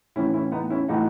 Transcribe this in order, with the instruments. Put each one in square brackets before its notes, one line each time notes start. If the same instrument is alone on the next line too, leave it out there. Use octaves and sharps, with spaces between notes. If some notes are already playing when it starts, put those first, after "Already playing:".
[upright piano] A2 E3 C#4 E4
C#4 E4
B3 D#4
C#4 E4
A2 E3 D#4 F#4